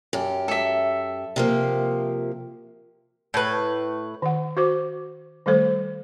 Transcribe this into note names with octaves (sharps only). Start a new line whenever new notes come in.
F#2 G4
A4 E5
C3 F3 A#3
A2 B4
D#3 F#5
F#4 C5 D6
D#3 G3 A3 A4 C5